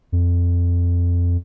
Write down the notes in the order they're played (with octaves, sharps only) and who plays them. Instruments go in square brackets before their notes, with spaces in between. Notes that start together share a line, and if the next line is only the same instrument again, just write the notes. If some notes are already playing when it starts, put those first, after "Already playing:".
[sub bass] F2